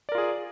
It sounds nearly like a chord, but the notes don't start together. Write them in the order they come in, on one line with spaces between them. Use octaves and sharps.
D5 A#4 F4 G#4